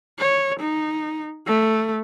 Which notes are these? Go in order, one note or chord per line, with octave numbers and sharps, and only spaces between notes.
C#5
D#4
A3